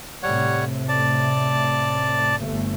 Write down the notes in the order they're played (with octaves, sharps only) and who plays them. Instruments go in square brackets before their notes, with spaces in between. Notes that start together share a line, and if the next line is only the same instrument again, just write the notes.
[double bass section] A2 C3 [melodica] G3 C#5 F#5
[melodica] D5 A5
[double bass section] G1 A3